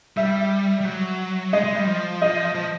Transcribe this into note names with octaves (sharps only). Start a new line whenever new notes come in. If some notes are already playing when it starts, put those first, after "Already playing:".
G3 E5
G3
F#3
G#3 D#5
G#3
G3
F3
D#5
F3